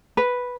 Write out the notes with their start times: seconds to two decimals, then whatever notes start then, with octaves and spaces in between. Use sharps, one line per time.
0.17 B4